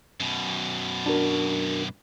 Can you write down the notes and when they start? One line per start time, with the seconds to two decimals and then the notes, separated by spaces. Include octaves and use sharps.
0.20 F#2 B2
1.06 D4 F#4 A#4